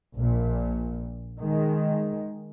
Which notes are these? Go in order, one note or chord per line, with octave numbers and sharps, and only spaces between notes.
A#1 A#2
D#3 G#3